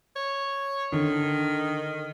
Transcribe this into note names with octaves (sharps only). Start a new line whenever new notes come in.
C#5
D3 D#3